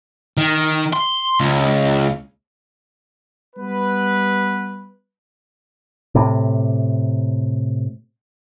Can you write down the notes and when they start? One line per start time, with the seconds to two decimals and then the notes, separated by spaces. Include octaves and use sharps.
0.37 D#3
0.93 C6
1.40 C#2
3.56 G3 B3 B4
6.15 A2 C3